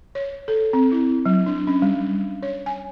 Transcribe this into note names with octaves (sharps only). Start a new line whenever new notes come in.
C#5
A4
C4
E4
F#3
D4
C#4
G3
C#5
G#5